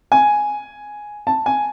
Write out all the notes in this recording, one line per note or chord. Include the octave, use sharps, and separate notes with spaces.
G#5
A5
G#5